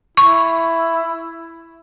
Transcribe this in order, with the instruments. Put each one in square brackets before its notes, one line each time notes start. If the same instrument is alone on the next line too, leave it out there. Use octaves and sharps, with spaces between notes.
[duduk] E4 [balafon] C#6